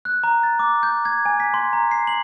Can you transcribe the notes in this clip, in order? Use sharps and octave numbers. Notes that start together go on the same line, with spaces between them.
F#6
A#5
A6
D6
G6
G#6
G#5
B6
C6
A#5
C7
F#7